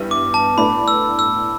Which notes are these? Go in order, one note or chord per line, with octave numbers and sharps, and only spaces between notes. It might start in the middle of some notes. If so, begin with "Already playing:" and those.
Already playing: G2 E3 B3 G4 E5
D6
A5
A2 A3 D4 B4 D5 B5
E6
E6